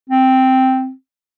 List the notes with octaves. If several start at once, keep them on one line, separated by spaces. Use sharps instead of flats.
C4